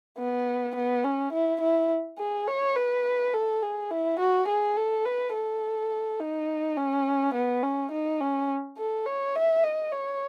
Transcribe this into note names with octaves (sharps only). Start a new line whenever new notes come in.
B3
B3
C#4
E4
E4
G#4
C#5
B4
A4
G#4
E4
F#4
G#4
A4
B4
A4
D#4
C#4
B3
C#4
D#4
C#4
A4
C#5
E5
D#5
C#5